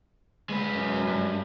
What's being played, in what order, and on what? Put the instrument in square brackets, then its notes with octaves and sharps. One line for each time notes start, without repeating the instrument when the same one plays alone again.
[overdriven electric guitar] G#3 B4
[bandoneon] F#2
[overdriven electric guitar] G2